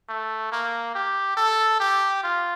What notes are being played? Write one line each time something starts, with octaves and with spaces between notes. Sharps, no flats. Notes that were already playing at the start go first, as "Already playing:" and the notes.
A3
A#3
G4
A4
G4
F4